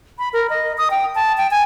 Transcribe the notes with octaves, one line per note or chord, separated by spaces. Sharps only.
B5
A#4
D#5
D#6
G5
A5
G5
G#5